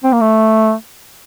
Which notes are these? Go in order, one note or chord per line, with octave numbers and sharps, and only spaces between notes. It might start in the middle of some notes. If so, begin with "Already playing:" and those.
C4
A#3
A3